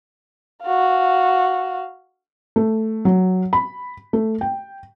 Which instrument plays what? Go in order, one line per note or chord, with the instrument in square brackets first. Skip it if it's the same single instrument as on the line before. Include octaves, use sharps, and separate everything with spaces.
[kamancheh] F#4 F5
[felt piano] A3
F#3
B5
A3
G5